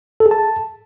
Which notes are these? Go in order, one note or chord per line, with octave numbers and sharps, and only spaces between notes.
A4
G#4
A5